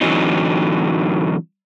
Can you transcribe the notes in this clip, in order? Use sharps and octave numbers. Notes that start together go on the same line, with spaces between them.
A2 D3 E3 F#3 C4 D#4